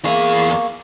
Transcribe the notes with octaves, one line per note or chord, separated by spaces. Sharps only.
E2 A#3 G#4 C#6